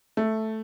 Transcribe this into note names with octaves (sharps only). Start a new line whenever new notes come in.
A3